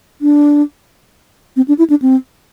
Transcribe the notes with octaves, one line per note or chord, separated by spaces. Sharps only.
D4
C4
D4
E4
D4
C4